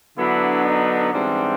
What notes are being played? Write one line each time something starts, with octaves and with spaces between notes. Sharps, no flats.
D3 F#3 B3 D4 E4
D#4
G#2 E3 G3 C4 D4